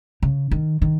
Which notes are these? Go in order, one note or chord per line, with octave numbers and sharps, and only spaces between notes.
C#3
D#3
D#3